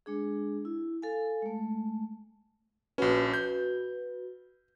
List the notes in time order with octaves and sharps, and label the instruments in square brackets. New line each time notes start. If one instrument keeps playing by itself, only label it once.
[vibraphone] G#3 D4 G#4
E4
A4 F5 G#5
G#3 A3
[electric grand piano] A#1 C#4 [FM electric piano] F#4 B4
[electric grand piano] G6